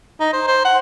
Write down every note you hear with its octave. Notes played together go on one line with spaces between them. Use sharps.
D#4
C5
C5
F#5